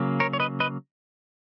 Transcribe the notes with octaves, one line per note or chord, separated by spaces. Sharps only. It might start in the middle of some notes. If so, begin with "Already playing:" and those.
Already playing: C#3 F#3 A#3
A#4 C#5
C#5
B4 D#5
B4 D#5